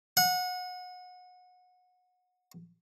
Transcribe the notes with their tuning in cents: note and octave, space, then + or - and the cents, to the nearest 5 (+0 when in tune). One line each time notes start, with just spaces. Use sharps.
F#5 -25